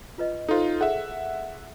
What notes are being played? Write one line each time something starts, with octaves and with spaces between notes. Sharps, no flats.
F4 B4 D#5
D#4 F4 A4 C5
G#4 E5 F#5